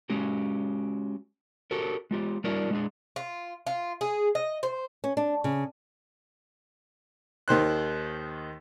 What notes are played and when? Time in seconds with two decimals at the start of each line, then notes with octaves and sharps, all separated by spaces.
0.10 G#3 C#4 F#4 G4
1.71 F#4 G4 A4 A#4
2.11 G#3 F4 G4
2.44 G3 D4 E4 F#4 A#4 D5
2.71 G#3 D4 G#4
3.16 F4
3.67 F4
4.01 G#4
4.35 D#5
4.63 C5
5.04 C#4
5.17 D4
5.44 C#3
7.48 D#2 D#3 C5 F#6